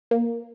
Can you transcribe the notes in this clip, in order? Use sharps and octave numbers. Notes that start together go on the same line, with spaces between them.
A#3